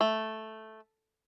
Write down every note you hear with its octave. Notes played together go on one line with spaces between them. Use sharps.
A3